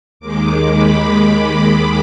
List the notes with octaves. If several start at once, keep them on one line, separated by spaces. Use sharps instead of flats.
D#2 D#3 G#3 D6
B5